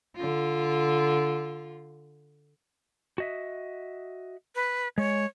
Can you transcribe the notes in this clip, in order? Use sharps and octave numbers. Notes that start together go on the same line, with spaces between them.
D3 F4
F#4 D#5 E5
B4
G#3 C#5